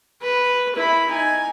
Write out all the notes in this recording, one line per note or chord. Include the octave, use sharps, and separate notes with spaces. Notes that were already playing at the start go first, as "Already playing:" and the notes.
B4
E4 B5
D#4 G#5